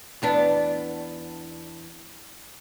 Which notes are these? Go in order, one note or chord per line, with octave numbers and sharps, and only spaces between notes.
E2 B3 D4